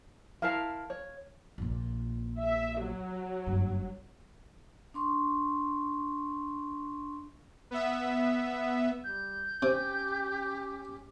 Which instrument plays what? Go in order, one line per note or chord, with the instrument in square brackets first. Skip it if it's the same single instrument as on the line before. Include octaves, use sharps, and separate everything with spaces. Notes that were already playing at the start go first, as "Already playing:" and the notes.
[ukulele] E4 A#4 A5 [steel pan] F5
[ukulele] C#5
[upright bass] A#1 A#2
[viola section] E5
F#3
[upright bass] F#1 G2
[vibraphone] D4 C6 C#6
[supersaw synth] B3 E5
[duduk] G3 [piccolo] G6
[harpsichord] C3 [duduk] C#4 [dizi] G4